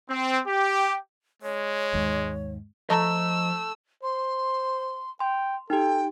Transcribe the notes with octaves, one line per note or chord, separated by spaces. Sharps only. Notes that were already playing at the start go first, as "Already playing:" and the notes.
C4
G4
G#3 C#5
D#2 G#2
F3 A3 D#5 A#5 E6
C5 C6
G5 C6
D#4 G4 A4 G5